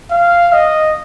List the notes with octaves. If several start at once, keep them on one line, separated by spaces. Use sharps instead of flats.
F5
D#5